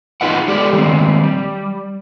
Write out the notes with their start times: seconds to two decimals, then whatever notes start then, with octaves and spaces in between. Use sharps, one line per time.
0.21 D#4 F4 G#4 B4 D#5 F#5
0.48 G#3 G4 A4 D5
0.73 D#3 G3 G#3 C4
1.23 G3